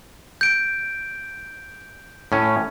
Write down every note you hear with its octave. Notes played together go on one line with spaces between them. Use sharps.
G6 D7
A2 C#4